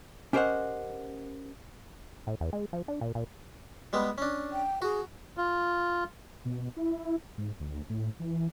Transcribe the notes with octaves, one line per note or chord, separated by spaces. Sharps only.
C#4 G4 A#4 C5 D#5 F#5
A2
E2
G#3
F3
D4
A#2
A#2
G3 G#3 B3
C#4 D4
G5
F#4 G#4
F4
B2
E4
G#2
D2
A2
E3